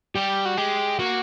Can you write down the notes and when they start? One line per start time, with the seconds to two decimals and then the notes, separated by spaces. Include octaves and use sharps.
0.15 G3 G4
0.45 F#4
0.57 G#3 G4
0.99 A#3 F#4